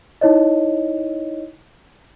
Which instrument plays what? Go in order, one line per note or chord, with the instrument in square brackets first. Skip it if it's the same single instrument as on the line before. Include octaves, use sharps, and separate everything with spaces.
[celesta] D#4 E4 C#5 D#5